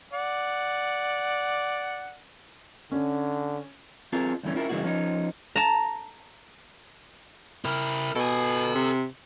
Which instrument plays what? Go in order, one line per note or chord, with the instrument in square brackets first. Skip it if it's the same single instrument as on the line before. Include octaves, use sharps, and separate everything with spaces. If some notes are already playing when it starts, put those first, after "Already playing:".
[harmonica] D5 F#5
[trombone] D3 [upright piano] C#4
[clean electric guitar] C4 F4 G#4 A#4
D2 G2 E3 A3 C#4
C#4 E4 F4 A#4
G2 C#3 E3 G#3 A#3 F#4
F3 C#4 D#4
[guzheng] A5 A#5
[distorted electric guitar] E4 A#4
[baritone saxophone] B2 [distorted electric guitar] A4 G#5
[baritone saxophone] C3